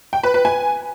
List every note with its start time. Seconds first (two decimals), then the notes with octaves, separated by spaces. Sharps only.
0.13 G5
0.23 B4
0.34 B4
0.45 G#5